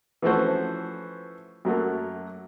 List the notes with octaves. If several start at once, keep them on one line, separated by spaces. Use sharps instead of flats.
E3 F3 A3 C#4 F#4 C5
F#2 F#3 A3 A#3